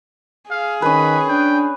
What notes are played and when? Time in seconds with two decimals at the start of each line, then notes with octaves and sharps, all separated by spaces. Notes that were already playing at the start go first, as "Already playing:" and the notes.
0.51 G#4 F5
0.82 D#3 C#4 B4 B5
1.28 D4 G5